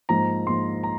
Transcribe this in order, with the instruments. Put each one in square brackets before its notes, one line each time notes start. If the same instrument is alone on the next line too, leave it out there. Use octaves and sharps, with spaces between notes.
[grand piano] G#2 F3 A#3 A#5
G#2 F3 A#3 C6
A#5